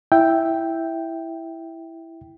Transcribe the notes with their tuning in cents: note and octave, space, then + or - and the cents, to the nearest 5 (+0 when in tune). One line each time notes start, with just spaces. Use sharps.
E4 +0 E5 +0 G5 -5